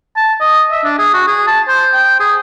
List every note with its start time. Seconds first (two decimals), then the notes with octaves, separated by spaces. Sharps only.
0.17 A5
0.40 D#5
0.71 E5
0.84 D4
0.99 G#4
1.14 F#4
1.27 G#4
1.47 A5
1.68 C5
1.94 G5
2.20 G#4